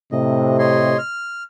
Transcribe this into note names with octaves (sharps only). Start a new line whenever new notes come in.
A2 C3 D#5
C#5 D#5 C6
F6